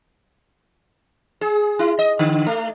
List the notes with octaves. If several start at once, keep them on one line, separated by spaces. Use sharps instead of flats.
G#4
E4
D#5
D3
A3